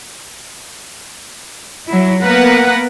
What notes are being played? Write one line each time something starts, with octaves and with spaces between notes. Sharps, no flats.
F#3 E4
A#3 B3 A#4 B4 F#5